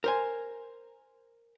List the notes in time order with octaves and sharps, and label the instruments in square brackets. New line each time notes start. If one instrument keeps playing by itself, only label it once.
[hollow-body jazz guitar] A#4 C5 G#5